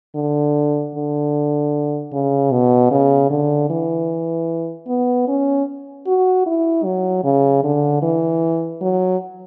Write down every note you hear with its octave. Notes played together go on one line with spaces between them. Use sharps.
D3
D3
C#3
B2
C#3
D3
E3
B3
C#4
F#4
E4
F#3
C#3
D3
E3
F#3